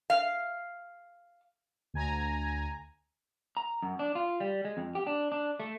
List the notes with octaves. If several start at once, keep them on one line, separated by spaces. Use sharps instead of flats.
F5
D2 G#5 A#5
A#5
F#2
D4
F4
G3
G#3
F2
G4
D4
D4
A3